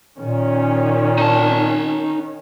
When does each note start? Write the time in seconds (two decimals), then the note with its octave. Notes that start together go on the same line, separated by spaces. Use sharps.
0.20 A#2 D#3 C#4
1.18 D#4 A5